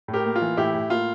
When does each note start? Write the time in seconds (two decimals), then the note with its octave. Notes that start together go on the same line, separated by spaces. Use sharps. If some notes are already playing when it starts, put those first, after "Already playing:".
0.08 A2
0.13 G4 A#4
0.25 A#3
0.36 F4
0.41 E3
0.57 A2 E4 G4
0.74 A2
0.90 A#3 F4